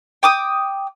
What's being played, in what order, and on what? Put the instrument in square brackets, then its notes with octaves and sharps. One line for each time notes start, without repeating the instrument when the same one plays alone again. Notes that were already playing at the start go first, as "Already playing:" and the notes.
[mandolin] G5 D6 D#6